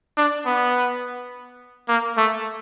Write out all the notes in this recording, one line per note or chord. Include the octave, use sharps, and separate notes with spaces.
D4
B3
A#3
A3